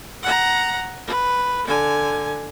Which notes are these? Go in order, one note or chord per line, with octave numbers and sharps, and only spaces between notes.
F#5 A#5
B4
D3 G#5